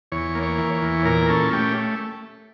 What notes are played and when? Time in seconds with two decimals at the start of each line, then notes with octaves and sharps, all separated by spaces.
0.12 E2 C#5
0.35 A#3
0.43 C#5
0.58 E3
0.74 C#5
0.82 E2
1.05 A#2 A#4
1.28 C#4 A4
1.52 A3 G4